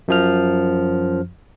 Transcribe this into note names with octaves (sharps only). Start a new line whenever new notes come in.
F#2 F3 F6